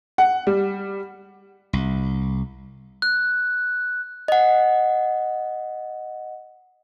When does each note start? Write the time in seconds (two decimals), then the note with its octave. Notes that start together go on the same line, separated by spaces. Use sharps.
0.18 F#5
0.47 G3
1.73 C2
3.02 F#6
4.28 D#5 F#5